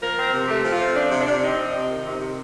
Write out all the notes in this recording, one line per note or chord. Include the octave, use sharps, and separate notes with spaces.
F3 A#4
C4
C3
A3 G4
F3
F4
C4
F3 D4
C3
D4
C3
C4 D#4
F3
C3
D#3
C3
C3